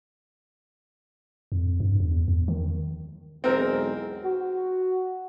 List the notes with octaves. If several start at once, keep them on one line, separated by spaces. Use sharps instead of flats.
F2
G2
E2
E2
D#3
B1 E2 G#3 C4 A#4
F#4